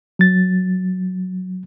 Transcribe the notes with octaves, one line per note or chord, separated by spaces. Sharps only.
F#3 A6